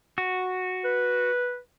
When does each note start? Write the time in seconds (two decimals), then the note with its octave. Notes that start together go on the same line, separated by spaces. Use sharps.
0.18 F#4
0.85 B4